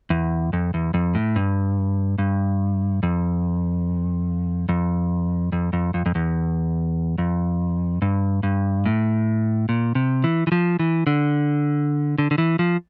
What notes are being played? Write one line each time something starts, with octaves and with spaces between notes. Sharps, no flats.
E2
F2
E2
F2
A2
G2
G2
F2
F2
F2
F2
F2
F2
E2
F2
G2
G2
A2
A#2
C3
E3
E3
F3
E3
D3
D3
D3
E3
F3